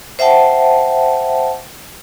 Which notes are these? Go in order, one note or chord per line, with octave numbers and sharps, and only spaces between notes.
C5 E5 F#5 G5 A5